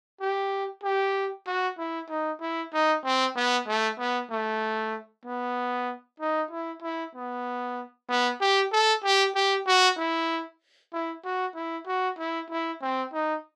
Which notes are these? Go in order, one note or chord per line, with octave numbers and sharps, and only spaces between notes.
G4
G4
F#4
E4
D#4
E4
D#4
C4
B3
A3
B3
A3
B3
D#4
E4
E4
B3
B3
G4
A4
G4
G4
F#4
E4
E4
F#4
E4
F#4
E4
E4
C4
D#4